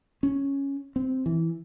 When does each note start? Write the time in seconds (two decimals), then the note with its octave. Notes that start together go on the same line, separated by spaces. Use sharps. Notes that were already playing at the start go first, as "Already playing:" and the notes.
0.23 C#4
0.96 C4
1.26 E3